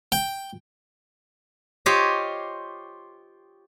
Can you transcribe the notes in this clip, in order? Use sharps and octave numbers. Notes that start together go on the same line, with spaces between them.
G5
F4 G4 C5 C#5 D#5